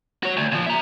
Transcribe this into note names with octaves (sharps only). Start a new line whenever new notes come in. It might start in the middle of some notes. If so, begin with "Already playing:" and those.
F#4 C#5
D2
A#2 F3
E5 A#5